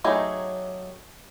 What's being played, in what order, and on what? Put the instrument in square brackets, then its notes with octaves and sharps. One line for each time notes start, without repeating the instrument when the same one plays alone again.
[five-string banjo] F#3 A3 D#4 G4 G#4